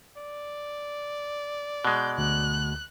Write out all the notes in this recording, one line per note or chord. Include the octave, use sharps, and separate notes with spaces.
D5
B2 G#3 F#6 G6
D2 F#6